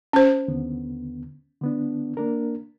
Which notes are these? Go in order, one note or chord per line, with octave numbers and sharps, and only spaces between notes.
C#4 C5
D#2 D3 B3
D3 B3 D4
A#3 D4 A#4